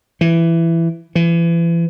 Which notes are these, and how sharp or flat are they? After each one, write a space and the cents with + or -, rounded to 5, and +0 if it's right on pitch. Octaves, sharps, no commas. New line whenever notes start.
E3 +15
E3 +35